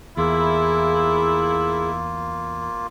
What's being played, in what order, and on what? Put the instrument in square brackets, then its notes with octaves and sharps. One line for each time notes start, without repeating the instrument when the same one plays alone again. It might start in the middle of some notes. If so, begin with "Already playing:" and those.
[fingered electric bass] E2 [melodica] A#3 F4 [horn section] E4 [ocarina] G#4